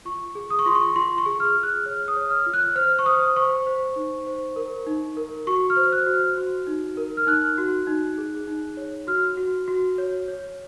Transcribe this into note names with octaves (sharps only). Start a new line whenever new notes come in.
F4 C#6
G#4
D#6
C#6
F4 C6
C#6
F4 C6
C#6
G#4
F6
G#4
F#6
C#5 F6
D#6
C#5
F6
F4
F#6
C5 F6
C#6
C5 D#6
C5 C#6
C5
D#4
C5
A#4
D#4
A#4
F#4 C#6
F6
C5
F#6
F#4
F6
F#4
D#4
A#4
F6
D#4 F#6
F#4
D#4
G#4
D#4
C#5
F#4 F6
F#4
F#4
C#5
C#5